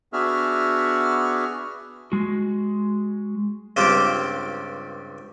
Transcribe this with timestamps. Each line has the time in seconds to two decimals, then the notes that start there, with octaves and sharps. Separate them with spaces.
0.13 B3 D4 F#4 G#4 E5 F6
2.12 G#3 F#4
3.76 C#2 G2 C4 F4 G4 D6